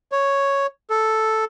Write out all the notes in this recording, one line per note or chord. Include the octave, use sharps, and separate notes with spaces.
C#5
A4